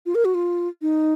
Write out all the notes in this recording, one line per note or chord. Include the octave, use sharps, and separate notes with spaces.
F4
A#4
F#4
F4
D#4